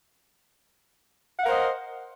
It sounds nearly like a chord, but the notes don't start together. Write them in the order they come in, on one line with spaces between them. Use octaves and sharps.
F#5 F5 A#4 C5 D#5